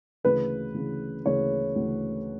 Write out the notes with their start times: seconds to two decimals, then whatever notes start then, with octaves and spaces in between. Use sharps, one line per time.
0.24 D2 C#3 E3 B4
0.74 D2 C#3 E3
1.25 D2 C#3 E3 C#5
1.76 D2 C#3 E3